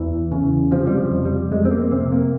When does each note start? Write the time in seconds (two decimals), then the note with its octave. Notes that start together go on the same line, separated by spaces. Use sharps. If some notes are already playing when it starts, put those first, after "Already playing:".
Already playing: E2 E3
0.32 C#3
0.71 C3 F3
0.87 G3
0.98 F3
1.11 F2
1.25 G3
1.51 F2 G#3
1.65 C4
1.71 A#3
1.91 C3 C4
2.12 A#3